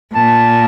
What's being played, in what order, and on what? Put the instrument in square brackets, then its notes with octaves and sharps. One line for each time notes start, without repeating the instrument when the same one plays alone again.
[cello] A#2 [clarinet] A5